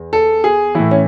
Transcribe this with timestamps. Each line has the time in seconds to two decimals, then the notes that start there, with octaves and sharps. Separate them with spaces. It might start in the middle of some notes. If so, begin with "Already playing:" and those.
Already playing: E2
0.13 A4
0.44 G#4
0.75 A2 E3 E4
0.91 C#4